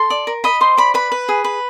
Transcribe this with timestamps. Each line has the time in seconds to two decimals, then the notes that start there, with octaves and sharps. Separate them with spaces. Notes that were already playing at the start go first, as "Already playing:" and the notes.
Already playing: A4 C6
0.10 D5
0.27 A#4
0.44 D#5 B5
0.61 C5 C6
0.77 D5 B5
0.94 B4 B5
1.12 B4
1.29 G#4
1.44 B4